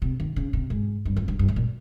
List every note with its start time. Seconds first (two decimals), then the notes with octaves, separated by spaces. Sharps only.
0.02 C3
0.20 D#3
0.36 C#3
0.53 C3
0.70 G#2
1.06 G2
1.17 F2
1.28 G2
1.39 G2
1.48 G#2
1.56 A#2